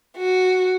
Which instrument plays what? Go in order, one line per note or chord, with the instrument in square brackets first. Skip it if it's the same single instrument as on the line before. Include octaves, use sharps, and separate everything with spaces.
[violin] F#4